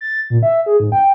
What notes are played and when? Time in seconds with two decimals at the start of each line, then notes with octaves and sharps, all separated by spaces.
0.01 A6
0.30 A#2
0.43 E5
0.66 G#4
0.80 G#2
0.92 G5